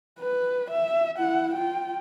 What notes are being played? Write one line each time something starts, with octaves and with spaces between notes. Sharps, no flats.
B4
E5
E4 F#5
F4 G5